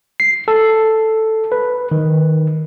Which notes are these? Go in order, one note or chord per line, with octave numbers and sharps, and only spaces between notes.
C7
A4
B4
D#3